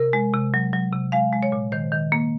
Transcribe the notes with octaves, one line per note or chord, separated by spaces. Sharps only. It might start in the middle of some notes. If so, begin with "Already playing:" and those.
Already playing: C3 A#4
G#3
C3
F#3
F#3
C3
G#3 F5
G#3
C#5
A#2
D#3 C5
D#3
A#3